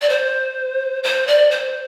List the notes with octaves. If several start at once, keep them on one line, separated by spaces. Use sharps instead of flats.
D5
C5
C5
D5
C5